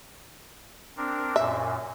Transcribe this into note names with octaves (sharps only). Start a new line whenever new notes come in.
C4 D4 A#4
F#2 A#2 E5